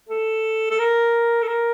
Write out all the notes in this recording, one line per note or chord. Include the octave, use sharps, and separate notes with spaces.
A4
A4
A#4
A4
A#4